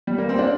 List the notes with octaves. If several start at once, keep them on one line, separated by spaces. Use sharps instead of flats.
G3
A#3
C4
D4